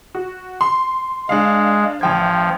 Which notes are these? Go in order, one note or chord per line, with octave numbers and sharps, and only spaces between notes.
F#4
C6
G#3 D4 F5
A1 F3 G5 G#6